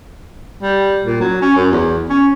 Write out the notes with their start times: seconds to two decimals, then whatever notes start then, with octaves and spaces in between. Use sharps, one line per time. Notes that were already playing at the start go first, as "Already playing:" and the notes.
0.62 G3
1.04 A#2
1.20 F#3
1.42 C#4
1.56 F#2
1.71 E2
2.09 C#4